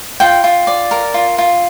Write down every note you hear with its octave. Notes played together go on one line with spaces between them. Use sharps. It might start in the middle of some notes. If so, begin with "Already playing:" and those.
F4 G5
F4
D5
A#4
F4
F4